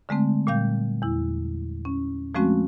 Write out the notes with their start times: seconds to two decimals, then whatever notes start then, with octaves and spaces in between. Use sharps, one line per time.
0.09 D3 G#3 A3 C4
0.47 A#2 G3 F5 G6
1.02 E2 E4
1.85 C#4
2.35 F3 G#3 A3 C4 C#4 F#4